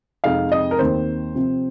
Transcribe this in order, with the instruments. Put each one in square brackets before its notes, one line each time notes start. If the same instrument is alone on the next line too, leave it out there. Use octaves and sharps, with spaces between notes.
[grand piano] F2 C3 G#3 D#4 F5
D#5
A#4
D#2 D#3 C4 C5
C3 F3 C4